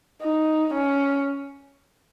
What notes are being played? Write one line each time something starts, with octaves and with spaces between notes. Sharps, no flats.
D#4
C#4